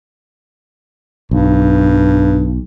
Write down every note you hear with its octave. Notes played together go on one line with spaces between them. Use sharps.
B1 G2